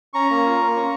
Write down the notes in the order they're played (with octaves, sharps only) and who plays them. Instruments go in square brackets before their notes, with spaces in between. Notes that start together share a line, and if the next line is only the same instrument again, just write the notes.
[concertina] C#4 A#5 C#6
A#3
F4
A#3
C#4